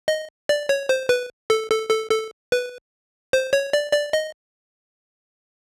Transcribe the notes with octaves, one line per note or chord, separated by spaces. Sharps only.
D#5
D5
C#5
C5
B4
A4
A4
A4
A4
B4
C5
C#5
D5
D5
D#5